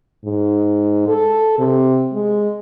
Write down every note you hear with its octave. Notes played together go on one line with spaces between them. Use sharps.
G#2
A4
C3
G#3